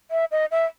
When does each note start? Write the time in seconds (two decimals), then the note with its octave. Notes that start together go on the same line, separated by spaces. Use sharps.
0.11 E5
0.32 D#5
0.51 E5